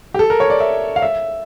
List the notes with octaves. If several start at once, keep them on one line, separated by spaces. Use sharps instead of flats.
G4
A4
A#4
C#5
D5
E5
F5
E5